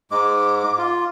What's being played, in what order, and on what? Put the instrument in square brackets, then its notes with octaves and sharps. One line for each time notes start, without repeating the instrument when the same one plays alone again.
[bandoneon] G#2 G#3 [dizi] D6
[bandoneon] F4